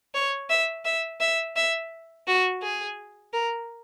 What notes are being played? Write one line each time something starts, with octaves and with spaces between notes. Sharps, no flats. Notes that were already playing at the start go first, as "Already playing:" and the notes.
C#5
E5
E5
E5
E5
F#4
G#4
A#4